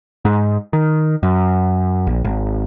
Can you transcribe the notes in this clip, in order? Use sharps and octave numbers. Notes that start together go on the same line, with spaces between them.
G#2
D#3
F#2
A#1
G#1